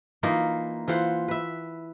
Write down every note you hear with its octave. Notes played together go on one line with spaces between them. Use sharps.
E3 A#3 D#4 F4
E3 F4 C5 F#5
B4 E5